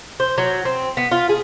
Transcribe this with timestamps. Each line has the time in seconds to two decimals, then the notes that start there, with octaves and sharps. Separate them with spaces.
0.20 C5
0.38 F#3
0.65 C4
0.97 B3
1.11 F4
1.29 G#4